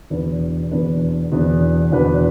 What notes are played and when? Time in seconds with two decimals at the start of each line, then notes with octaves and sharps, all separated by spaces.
0.10 E2 B2 B3 D4 B4
0.71 E2 B2 B3 D4 B4
1.32 E2 B2 B3 D4 B4
1.92 E2 B2 B3 D4 B4